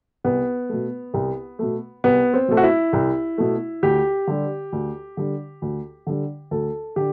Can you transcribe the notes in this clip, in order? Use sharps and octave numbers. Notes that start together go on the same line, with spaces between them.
C2 B3
B2 A3
C2
B2 A3
C2 B3
C4
B2 A3
F#4
E4
C2
B2 A3
D2 G4
D3 G3
D2
D3 G3
D2
D3 G3
D2 A4
D3 G4